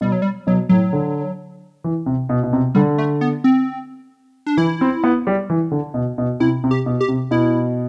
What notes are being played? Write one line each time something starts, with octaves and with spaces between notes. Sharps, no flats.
B2 G3
F#3
G3
B2 F#3
A2 F#3
D3
E3
C3
B2
B2
C3
D3 G3
A3
B3
C4
D4
E3 E4
C4
B3
G3
E3
D3
B2
B2
C3 E4
C3
G4
B2
G4
C3
B2 E4